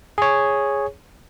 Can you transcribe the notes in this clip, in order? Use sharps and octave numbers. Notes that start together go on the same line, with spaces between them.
G#4 C#5